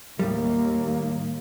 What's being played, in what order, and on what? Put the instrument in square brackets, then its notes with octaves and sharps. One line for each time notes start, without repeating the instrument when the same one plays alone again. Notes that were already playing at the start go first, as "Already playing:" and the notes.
[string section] D#2 [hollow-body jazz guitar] A2 G3 [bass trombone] A#3